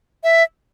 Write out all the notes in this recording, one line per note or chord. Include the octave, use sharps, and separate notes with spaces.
E5